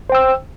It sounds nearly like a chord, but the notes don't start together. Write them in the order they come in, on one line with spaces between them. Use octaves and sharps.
C5 G5 E6